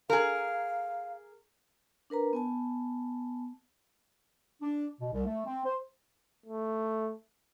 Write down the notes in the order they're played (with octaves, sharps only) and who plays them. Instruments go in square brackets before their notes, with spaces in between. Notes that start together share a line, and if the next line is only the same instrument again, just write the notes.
[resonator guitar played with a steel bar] G#4 A#4 [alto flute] F5
[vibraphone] D4 A#4 B4 A#5
B3 G#5 A5
[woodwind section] D4
B2
C2
A3
C4
C5
[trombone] A3